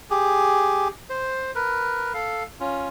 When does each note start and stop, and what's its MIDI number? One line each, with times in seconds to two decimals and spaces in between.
0.10 0.88 67
0.10 0.88 68
1.10 1.51 72
1.55 2.13 70
1.55 2.13 71
2.14 2.43 69
2.14 2.43 77
2.60 2.88 61
2.60 2.88 65